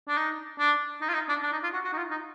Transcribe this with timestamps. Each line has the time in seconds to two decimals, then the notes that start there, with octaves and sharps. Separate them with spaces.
0.08 D4
0.17 D#4
0.59 D4
1.01 D#4
1.09 F4
1.14 D#4
1.29 D4
1.43 D4
1.52 D#4
1.63 F4
1.73 F#4
1.84 F#4
1.93 D#4
1.98 F4
2.11 D#4